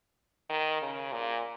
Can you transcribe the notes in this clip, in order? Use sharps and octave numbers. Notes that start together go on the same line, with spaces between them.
D#3
C#3
A#2